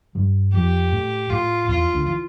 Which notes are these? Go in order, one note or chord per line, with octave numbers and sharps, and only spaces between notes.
G2 G3
F2 F3 G4
A2 A3
A2 A3 F4
E2 E3 F4
D2 D3
E3